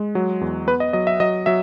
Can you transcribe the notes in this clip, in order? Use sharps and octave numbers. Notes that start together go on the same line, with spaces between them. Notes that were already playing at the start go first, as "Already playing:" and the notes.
Already playing: G#3
F#3
E2
B3 B4
D#5
F#3 D#5
E5
F#3 D#5
F#3 E5